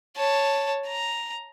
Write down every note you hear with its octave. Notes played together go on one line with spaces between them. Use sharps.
C#5 A5
A#5